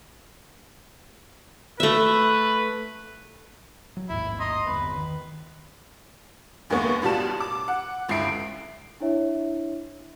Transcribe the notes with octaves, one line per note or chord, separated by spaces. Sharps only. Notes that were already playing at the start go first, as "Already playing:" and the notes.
A3 B4 E5
F#3
A1 D#2 G#2 E4
D#5 A#5 C6
G1 E2 B4
D#3
F#1 D#2 G#3 A#3 B3 C#6
A1 B2 G3 F4 A5 E7
D6
F#5
G1 C#2 E4 C7 D7
D4 E4 C#5 E5